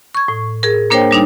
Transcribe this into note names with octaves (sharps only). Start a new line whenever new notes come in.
C#6 G#6
A2
G#4 A#4
A#3 D4 A#4 C5 C#5 G5
G3 D4 D#4